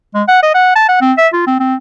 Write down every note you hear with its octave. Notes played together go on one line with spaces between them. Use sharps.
G#3
F#5
D#5
F#5
A5
F#5
C4
E5
F4
C4
C4